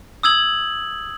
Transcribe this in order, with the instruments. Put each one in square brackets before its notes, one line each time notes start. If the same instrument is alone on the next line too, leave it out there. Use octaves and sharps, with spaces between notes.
[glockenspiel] D#6 E6 G#6 F#7